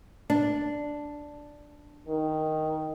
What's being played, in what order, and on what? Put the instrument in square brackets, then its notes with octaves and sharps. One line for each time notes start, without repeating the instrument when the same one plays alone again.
[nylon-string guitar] D4
[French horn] D#3